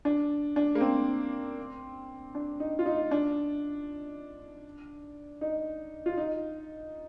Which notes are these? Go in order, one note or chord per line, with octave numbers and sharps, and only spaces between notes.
D4
D4
A#3
C4
D4
D#4
F4
D#4
D4
D#4
F4
D#4